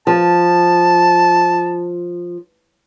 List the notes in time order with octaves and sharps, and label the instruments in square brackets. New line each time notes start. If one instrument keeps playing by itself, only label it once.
[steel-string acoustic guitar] F3 [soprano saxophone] A5